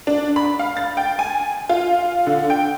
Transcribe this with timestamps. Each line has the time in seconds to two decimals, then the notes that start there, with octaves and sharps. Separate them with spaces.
0.07 D4
0.36 B5
0.59 F5
0.77 A6
0.97 G5
1.19 G#5
1.69 F4
2.27 D3
2.50 G5